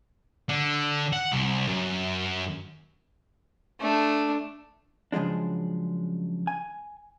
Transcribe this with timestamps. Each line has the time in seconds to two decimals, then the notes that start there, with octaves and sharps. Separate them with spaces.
0.49 D3
1.13 F#5
1.32 C2
1.68 F#2
3.80 A3 D4
5.12 C#3 F3 F#3 G#3 D4
6.47 G#5